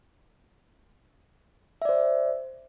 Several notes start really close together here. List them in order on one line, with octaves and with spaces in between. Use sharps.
E5 D5 C5